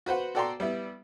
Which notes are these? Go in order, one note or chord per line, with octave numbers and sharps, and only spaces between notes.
F#4 B4 C5 F#5
F#4 A4 D5 G5 A#5 C6
G3 B3 E4